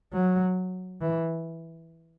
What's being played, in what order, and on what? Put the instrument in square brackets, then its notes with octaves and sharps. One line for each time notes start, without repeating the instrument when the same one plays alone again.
[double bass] F#3
E3